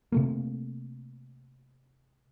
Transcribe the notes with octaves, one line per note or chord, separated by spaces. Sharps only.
C3 A3 A#3